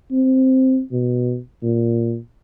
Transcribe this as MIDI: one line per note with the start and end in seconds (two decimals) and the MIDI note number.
0.11 0.81 60
0.91 1.38 47
1.62 2.17 46